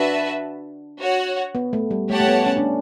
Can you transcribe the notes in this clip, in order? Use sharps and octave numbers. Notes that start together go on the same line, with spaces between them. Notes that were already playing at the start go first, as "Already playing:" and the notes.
Already playing: D4 F#4 B4 E5 A5
F#4 C#5 F#5
B3
A3
G3
A3 G4 C#5 F#5 A5
A3
B3
C#4
D4